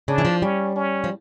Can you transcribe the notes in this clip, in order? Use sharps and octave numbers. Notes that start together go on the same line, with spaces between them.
C#3 D4
E3
F3
G3 C#4
C#4
F3